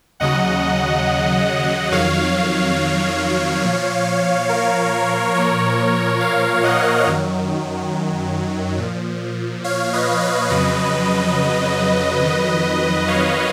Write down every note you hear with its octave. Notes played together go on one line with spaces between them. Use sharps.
D#2 C#3 F#3 D#5 F#5
F2 D#3 F#3 C#5 F5
A#2 F3
A#4
A#2 F3 A#4 C#5
C#5 F5
D#5 F#5
F#2 D#3 F#3
A#2 F3
C#5 F5
B4 D#5
B4 D#5
F2 C#3 F#3 B4 D#5
F2 D#3 F#3
C#5 F5